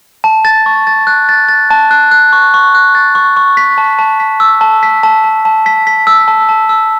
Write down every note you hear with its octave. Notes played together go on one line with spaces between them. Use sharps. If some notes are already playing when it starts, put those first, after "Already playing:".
A5
A6
C#6
A6
F#6
A6
A6
A5
F#6
F#6
C#6
C#6
F#6
A6
C#6
C#6
B6
A5
A5
B6
E6
A5
B6
A5
A5
A5
B6
B6
E6
A5
A5
E6